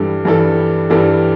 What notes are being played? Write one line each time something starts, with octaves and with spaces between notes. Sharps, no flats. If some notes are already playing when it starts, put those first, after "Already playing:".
Already playing: G2 E3 G3 D4 A4
G2 E3 G3 D4 A4
G2 E3 G3 D4 A4